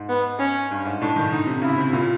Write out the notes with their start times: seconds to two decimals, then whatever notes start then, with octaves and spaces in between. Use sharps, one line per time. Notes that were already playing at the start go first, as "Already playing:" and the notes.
Already playing: G#2
0.09 B3
0.39 C#4
0.71 G2
0.85 G#2
1.01 A2 D4
1.16 D#3
1.32 D3 D#4
1.47 C3
1.62 C#3 E4
1.77 C3
1.93 A#2